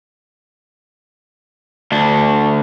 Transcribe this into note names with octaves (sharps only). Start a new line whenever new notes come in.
D2 D4